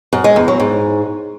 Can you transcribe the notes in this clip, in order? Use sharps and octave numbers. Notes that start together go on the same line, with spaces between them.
F#2
G#3
E2
F#3
G#2